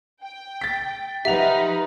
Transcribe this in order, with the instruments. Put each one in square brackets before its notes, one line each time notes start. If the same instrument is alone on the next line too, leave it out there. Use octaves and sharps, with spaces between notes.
[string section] G5
[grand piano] A6 B6
[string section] F3 D#4 B4 [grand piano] G4 F#5 F7 [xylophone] E5